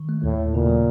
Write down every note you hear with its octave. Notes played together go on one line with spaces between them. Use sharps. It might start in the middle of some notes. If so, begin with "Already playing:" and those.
Already playing: D#3
A3
D#2 A2
D#2
A#2 C#3
F#3